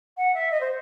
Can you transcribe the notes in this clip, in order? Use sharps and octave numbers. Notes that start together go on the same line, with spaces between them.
F#5
E5
D#5
C5